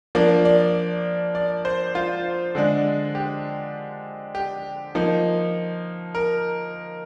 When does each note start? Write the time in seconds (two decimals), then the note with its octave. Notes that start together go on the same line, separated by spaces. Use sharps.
0.15 F3 A#3 D4 D5
0.45 D5
1.35 D5
1.65 C5
1.95 F4
2.55 D3 G#3 D4
3.15 G4
4.35 G4
4.95 F3 A#3 D#4
6.15 A#4